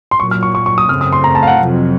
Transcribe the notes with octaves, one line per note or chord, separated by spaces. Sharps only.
C6
A#2 F#3 A#3 C#6
F6
C#6
C#6
C#6
D#6
F#2 C#3 A3 C4 F6
D#6
C6
A#5
A5
F5
F#5
F2 C3 F#3